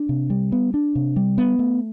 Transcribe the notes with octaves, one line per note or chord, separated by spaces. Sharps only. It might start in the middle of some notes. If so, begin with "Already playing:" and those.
Already playing: D4
C3
G3
B3
D4
C3
G3
B3
A3